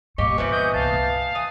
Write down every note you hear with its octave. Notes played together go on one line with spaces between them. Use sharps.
G2 A#2 G4 D#5 F5 C#6
E3 F3 B3
D#5 G6
C2 A#2 F5 A5
D4
E3 D#6